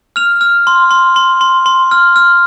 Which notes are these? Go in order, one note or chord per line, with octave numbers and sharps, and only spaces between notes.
F6 F7
F6
C6
C6
C6
C6
C6
F6
F6